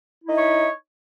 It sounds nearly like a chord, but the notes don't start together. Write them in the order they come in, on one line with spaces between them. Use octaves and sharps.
E4 D#4 E5 C#5